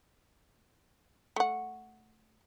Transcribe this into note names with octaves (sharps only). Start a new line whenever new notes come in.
A3 F#5